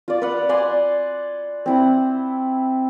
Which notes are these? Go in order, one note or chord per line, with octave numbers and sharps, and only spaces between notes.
F4 D5
B4 D5 F5 F#5
D5 F#5 G#5 C6
C4 E4 F#5